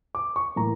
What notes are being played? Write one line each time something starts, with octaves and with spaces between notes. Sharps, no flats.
D6
C#6
A2 E3 A#3 A#5